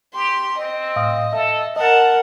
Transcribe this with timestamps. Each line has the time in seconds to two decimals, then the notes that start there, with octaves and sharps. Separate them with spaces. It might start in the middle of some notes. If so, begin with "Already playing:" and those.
0.14 G4 C6
0.58 C4 D#5
0.96 A2 F5 D#6
1.33 A4 E5
1.76 A#4 D#5 F#5 A5